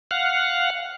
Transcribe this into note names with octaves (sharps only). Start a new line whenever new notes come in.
F5 F#5